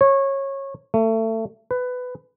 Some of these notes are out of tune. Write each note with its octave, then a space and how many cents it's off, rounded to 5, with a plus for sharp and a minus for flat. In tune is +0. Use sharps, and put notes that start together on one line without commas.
C#5 -20
A3 +25
B4 +15